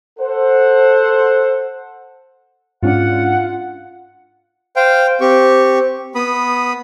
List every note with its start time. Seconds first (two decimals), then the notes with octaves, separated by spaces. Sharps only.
0.19 A4 C5 F#5
2.83 G#2 C#4 D4 F4 F#5
4.76 C5 F5 G5
5.21 C4 G4 C#6
6.15 B3 B5 D#6